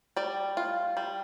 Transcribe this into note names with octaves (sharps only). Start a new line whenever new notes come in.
G3 D5
F4
G3